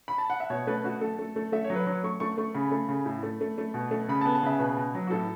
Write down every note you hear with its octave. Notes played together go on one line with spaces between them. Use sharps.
B5
A5
F#5
E5
B2 C#5
A3 B4
A3 F#4
A3 A4
A3
A3
A3 E5
C#5
F#3
B4
F#3 C#5
A3 C#6
A3 C#6
A3 C#6
C#3 B5
A3
C#3
A2
A3
A3
A3
B2
A3
C#3 B5
B3 A5
A5
C#3 E5
B2 B4
B2
F#3
F#4
A2 A4